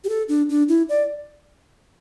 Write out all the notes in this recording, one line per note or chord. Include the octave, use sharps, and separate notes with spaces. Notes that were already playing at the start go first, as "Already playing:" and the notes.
G4
A4
D4
D4
E4
D5